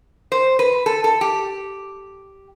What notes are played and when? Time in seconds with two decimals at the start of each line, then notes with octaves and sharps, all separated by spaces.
0.32 C5
0.59 B4
0.86 A4
1.04 A4
1.21 G4